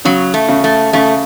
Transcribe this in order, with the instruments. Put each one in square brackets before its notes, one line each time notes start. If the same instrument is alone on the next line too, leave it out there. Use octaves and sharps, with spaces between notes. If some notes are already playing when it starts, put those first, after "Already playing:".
[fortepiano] C#3 [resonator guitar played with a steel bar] F#3
[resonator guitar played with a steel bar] A3
[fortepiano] C#3
[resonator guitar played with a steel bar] A3
[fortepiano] C#3 [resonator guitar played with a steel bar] A3